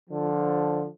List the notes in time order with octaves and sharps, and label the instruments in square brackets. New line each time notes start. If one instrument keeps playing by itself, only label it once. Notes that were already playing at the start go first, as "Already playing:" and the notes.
[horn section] D3 F3